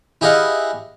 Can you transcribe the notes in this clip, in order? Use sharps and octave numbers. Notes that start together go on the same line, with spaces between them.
E4 G4 G#4 D#5 F5 F#5